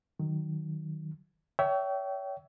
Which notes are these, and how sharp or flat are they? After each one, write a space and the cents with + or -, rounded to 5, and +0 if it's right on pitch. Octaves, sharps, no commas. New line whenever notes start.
D#3 -5 F#3 +0
C#5 +30 E5 +0 G5 -25